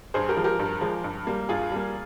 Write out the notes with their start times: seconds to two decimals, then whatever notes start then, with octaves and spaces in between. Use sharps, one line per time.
0.14 G2 G#4 C5
0.29 G4 A#4
0.37 F3 G#3
0.44 G4 A#4
0.59 G2
0.81 F3 G#3
1.04 G2
1.27 G3 A#3
1.49 G2 F4 G#4
1.72 G3 A#3